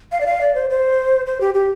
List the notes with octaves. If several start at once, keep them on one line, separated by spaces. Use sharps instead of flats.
F5
D5
F5
D5
C5
C5
C5
G4
G4